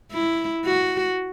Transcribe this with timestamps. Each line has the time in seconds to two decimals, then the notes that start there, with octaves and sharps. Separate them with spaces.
0.12 E4
0.65 F#4